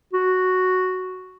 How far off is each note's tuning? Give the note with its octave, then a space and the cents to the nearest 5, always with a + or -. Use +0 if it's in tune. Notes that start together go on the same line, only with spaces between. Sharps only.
F#4 +0